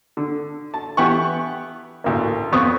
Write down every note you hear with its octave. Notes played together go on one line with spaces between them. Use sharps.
D3
A5
E3 B3 G4 F#5 C#6
A1 D2 A#3
F2 B3 C4 C#6 D#6